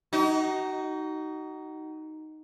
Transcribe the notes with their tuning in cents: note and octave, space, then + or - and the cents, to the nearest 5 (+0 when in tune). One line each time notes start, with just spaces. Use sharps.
D#4 +0 F#4 +35